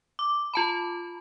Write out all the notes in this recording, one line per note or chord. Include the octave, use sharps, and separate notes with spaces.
D6
F4 A5 B5